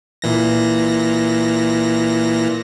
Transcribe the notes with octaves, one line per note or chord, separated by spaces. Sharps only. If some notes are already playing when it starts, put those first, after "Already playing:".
A#2 E3 A#6